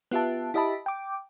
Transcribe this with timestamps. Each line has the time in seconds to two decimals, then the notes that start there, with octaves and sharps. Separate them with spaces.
0.11 B3 F4 G4 E5 A5
0.54 E4 G4 D#5 E5 A5 B5
0.86 G5 D6